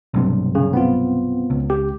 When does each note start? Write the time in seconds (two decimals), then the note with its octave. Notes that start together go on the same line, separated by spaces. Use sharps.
0.14 B1 G2 C3
0.55 C#3
0.73 B3 C4 F4
1.50 C#2
1.70 G4